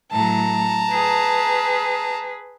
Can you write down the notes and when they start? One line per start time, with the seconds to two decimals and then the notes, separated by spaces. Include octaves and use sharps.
0.12 A2 F#3 A5 A#5
0.90 G#4 B4